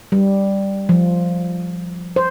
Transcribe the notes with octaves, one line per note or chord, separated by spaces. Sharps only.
G3
F3
C5